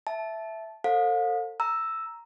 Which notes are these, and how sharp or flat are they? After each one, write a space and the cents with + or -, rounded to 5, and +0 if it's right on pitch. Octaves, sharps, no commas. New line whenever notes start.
E5 +0 A5 -15
A4 +30 C5 +35 F5 +40
A#5 +0 E6 +0